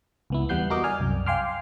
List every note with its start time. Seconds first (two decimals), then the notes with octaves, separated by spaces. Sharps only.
0.30 C#2 B3 E4
0.49 E2 G3 B3 F#5 G6 C7
0.70 F#4 A#4 D#5 D6
0.84 D5 G#5 F6
1.00 C2 F#2
1.26 F5 G5 G#5 C6 D6 F6